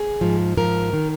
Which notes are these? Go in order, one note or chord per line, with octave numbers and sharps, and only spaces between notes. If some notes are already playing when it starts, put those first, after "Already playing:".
Already playing: G#4
G#2 F3
G#2 F3 A#4
D#3